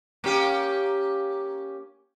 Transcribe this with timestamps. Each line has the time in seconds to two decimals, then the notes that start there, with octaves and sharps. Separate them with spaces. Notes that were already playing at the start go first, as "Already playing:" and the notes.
0.24 A#3 C#4 G4